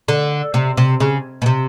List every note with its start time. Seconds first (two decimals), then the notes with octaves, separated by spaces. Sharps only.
0.08 D3
0.54 C3
0.77 C3
1.00 C#3
1.42 B2
1.46 C3